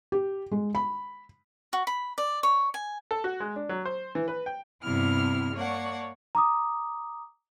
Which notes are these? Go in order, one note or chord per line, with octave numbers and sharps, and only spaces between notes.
G4
G#3
B5
F#4
B5
D5
C#5
G#5
A4
F#4
G#3
D4
F#3
C5
E3
B4
G5
G2 C3 B3 E4 F6
A#3 C#5 D5 F#5 A5
A#5 D6 D#6